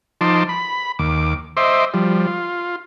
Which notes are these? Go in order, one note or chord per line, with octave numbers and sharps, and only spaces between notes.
F3 D#4 A5 C6 D6
B5
D#2 D6
C5 D#5 E5 C6 D6
F3 G3
F4